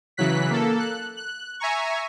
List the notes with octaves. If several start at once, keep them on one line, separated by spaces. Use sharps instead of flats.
C#3 E3 F#3 F#6 B6
A#3 A4
F#6
F#6
E5 G#5 A#5 C#6